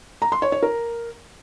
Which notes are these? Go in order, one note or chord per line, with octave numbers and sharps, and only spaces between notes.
A#5
C6
C#5
C#5
A#4